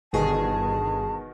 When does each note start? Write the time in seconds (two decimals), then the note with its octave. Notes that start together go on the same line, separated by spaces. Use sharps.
0.13 G1 B2 D#3 G#4 A5